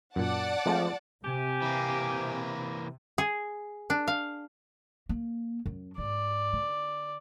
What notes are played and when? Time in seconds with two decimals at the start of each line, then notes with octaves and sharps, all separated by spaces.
0.16 F#2 A#2 D5 F#5 A5
0.66 F3 G#3 A3 C4
1.25 C3 G4 G#5
1.62 E3 A#3
3.18 G#4
3.90 D4
4.08 F5
5.09 A#3
5.66 F#2
5.98 G#2 D5
6.53 D3